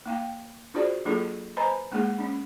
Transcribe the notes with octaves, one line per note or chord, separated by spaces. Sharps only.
A#3 F5 G5
D4 F4 F#4 G#4 C5 D5
F#3 A#3 D4 F4 G#4 A4
B4 C5 D#5 G#5 A#5 B5
G#3 A#3 D4 G#4 F#5
C#4 D4